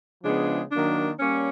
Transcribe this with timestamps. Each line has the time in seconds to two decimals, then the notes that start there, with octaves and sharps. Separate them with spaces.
0.24 C#3 F3 G#3 B3 D4
0.71 D#3 F#3 A#3 D4
1.19 G3 A#3 C#4